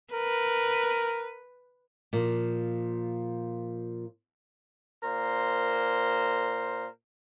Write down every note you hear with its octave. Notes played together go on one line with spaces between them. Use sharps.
A#4 B4
A#2 F3
A#2 A#4 C5